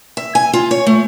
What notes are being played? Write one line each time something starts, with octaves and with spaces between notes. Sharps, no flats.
E5
G#5
F4
C#5
A3